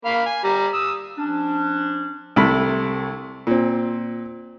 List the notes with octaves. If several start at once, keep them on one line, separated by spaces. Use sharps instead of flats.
A#3 F5 B5
G#5
G3 A#5
D#6 E6
F3 C#4 D4
C2 C3 A3 B5
A#2 C4